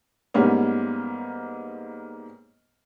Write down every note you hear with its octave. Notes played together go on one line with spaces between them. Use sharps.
G#2 G3 A#3 B3 C#4